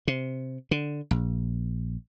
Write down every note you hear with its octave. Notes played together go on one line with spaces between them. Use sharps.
C3
D3
A#1